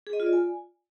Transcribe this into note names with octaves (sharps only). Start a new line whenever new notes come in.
G#4
D#5
F4
D5
G#5